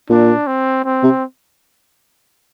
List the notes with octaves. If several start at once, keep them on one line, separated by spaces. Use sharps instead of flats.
A#2 D4
C4
C4
C3